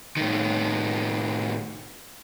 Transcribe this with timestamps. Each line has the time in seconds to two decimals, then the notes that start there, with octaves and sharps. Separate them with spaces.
0.17 A2 D#3